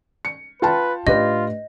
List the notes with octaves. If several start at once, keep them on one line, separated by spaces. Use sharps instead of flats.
C#7
F4 B4 G5 A5
A2 D4 F4 G4 B4 D#5